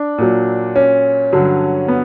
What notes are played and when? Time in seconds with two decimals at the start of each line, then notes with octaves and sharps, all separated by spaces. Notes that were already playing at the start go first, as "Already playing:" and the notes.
Already playing: D4
0.18 A#2 F#3
0.76 C#4
1.33 G2 D3 F#3
1.88 B3